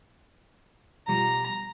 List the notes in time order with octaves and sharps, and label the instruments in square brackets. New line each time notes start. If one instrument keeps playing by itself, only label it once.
[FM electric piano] B2 F3 G3 [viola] A#5